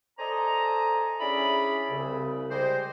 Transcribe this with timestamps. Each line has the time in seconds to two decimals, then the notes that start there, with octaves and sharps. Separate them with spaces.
0.19 A4 C5 D5 D#5 G#5 A#5
1.21 C#4 D4 E4 G#4 D5 B5
1.91 C2 C#3
2.51 G3 G#3 G4 G#4 A#4 C5